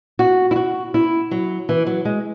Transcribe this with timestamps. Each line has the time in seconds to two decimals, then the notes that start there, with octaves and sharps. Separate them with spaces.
0.19 F#4
0.51 E4
0.56 F#4
0.94 E4
1.31 F#3
1.69 E3
1.87 F#3
2.05 G#3